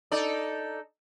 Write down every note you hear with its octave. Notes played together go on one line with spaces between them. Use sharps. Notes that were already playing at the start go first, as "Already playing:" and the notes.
D#4 A4 D5